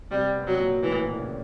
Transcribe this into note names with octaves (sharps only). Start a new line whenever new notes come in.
C3 G3 C4
B3
C4
B2 F#3 B3
A#2 A#3
A2 E3 A3
A#2 A#3
D4
C#3 C#4